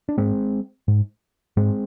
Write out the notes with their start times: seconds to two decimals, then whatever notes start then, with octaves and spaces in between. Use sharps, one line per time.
0.09 D4
0.18 G#2 G#3 C4
0.88 G#2
1.57 G#2 G#3 C4